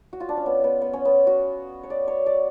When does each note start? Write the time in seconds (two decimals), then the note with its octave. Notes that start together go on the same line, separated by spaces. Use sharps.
0.13 F#4
0.20 F4
0.29 D4
0.37 C#4
0.46 B3
0.64 B3
0.82 B3
0.93 C#4
1.05 B3
1.27 F#4
1.83 C#5
1.90 D5
2.08 C#5
2.26 D5